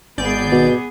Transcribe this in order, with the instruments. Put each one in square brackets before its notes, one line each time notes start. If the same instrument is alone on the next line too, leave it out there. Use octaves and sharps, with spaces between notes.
[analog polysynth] G#1 D5 G6 [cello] B3 G#4
[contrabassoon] B2